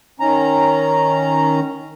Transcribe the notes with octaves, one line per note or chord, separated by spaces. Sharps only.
D#3 C#4 A#5